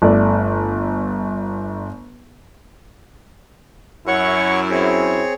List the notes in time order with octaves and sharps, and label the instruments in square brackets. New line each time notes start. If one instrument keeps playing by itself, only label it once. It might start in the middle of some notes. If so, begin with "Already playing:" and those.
[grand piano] G1 A3 D5
[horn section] F#2 E4 [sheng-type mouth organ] C#5 F#5 C#6
[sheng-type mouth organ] C4 G#4 C#5